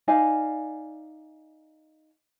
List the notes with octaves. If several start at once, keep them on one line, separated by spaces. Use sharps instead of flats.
D#4 D5 F5 G#5